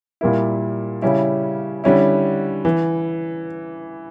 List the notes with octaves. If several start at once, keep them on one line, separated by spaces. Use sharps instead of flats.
A#2 G3 A#3 E4
C#3 G3 C#4 E4
D3 G3 C#4 E4
E3